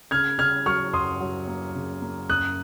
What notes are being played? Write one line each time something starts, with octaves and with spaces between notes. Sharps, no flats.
C#3 F6 G#6
C#3 F6 G#6
F#3 C#6 F6
F#2 C6 D#6
F#3
A#3
C#3
A#3
F#2 D#6 F#6